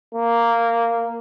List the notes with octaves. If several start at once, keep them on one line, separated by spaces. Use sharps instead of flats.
A#3